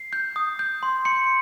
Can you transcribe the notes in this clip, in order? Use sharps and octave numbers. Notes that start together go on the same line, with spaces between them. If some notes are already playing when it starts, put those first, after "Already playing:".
Already playing: C7
G6
D#6
G6
C6
C6 C#7